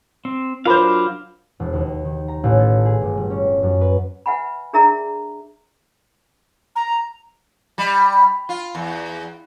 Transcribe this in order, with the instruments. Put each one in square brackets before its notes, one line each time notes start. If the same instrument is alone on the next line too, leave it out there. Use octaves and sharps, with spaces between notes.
[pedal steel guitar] C4
[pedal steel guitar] F#3 D4 F5 [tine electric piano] F4 B5 [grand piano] A#4 C5
[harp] E1
D#2
D#3
A#5
A1
A4
G#4
G1
G3
C#4
F#2
B4
[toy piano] B4 E5 F#5 G#5 B5
D4 G#4 A#4 D5 E5 A#5
[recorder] A#5
[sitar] G3
F4
E2